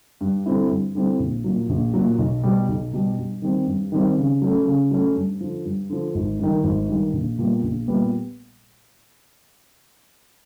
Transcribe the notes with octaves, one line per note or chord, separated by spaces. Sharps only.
G2
D3 G3 C4 E4
G2
D3 G3 C4 E4
A#1
A#2 F#3
A#1
A#2 F#3
B1
B2 G3
B1
B2 G3
G2
D#3 G3 C4
G2
D#3 G3 C4
C#3
F#3 A3 C#4
C#3
F#3 A3 C#4
G2
D3 F3
G2
D3 F3
G#1
G2 D#3
G#1
G2 D#3
A#1
A#2 G3 B3
A#1
A#2 G3 B3